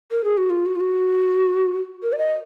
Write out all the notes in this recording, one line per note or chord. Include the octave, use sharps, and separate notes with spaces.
A#4
G#4
F#4
F4
F#4
F4
F#4
A#4
D5
D#5